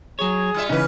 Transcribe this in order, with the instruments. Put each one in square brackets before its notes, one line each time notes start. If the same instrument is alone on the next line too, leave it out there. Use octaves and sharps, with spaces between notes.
[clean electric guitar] F#3 C#5 [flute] G#4
[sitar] G3 F4 E5
[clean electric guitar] C#2 D#4 [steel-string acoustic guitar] C#3 E3 [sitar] C#4 B4